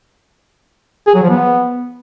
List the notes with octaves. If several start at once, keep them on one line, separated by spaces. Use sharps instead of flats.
G#4
F#3
F3
B3